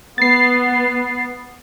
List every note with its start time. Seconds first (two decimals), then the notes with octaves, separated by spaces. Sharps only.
0.18 B3 A6 C7